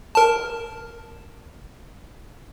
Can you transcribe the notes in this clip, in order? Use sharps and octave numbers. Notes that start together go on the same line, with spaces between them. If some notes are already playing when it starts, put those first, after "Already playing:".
A#4 A5